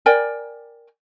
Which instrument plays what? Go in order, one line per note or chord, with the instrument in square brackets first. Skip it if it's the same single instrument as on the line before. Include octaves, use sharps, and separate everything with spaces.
[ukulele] A#4 D5 G5 G#5